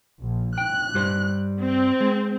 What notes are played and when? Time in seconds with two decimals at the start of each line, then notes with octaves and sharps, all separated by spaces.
0.19 A#1
0.58 G5 F#6
0.94 G2 G3 C5
1.63 C4
2.00 G#3